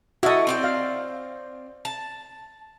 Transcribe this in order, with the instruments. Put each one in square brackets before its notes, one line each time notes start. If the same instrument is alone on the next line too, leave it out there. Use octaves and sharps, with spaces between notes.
[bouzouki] E4 A4 [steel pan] F#4 D#5
[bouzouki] C4 D5 G5
[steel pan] F5
[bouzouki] A5